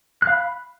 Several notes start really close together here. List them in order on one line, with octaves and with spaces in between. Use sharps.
F#6 F5 B5